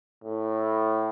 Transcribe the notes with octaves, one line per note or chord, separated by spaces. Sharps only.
A2